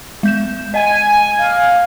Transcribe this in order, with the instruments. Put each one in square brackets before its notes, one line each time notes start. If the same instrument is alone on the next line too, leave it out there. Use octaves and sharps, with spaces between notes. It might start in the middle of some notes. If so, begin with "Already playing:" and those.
[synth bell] G#3 G6 E7
[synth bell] D#5 [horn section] G#5
[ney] F5